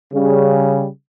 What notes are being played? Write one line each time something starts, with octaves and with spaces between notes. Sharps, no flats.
C#3 G3